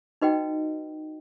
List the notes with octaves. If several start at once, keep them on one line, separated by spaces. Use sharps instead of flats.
D#4 F#4 B4 D#5 G5